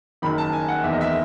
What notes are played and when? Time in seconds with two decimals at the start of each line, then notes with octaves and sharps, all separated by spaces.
0.22 F#1 F#2 D#3 B5
0.38 A5
0.53 G#5
0.68 F#5
0.84 F#1 E2 D#3 E5
0.92 D#5
1.01 E5